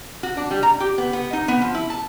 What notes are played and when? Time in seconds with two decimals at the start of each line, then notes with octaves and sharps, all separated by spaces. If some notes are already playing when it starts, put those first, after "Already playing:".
0.23 F#4
0.37 D4
0.51 G3
0.63 A#5
0.80 G4
0.98 B3
1.13 B3
1.33 D#4
1.48 B3
1.62 F3
1.75 E4
1.90 A5